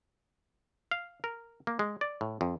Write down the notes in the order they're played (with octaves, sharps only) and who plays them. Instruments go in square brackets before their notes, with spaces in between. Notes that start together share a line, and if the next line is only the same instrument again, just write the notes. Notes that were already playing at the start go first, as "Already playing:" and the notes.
[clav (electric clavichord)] F5
A#4
A#3
G#3
D5
A2
F2